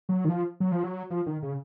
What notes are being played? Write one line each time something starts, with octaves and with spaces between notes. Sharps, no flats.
F#3
D#3
F3
F#3
F3
F#3
F3
D#3
C#3